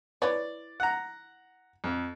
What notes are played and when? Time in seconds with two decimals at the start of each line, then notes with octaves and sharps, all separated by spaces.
0.22 E4 B4 C#5 D5
0.80 F#5 A#5
1.84 F2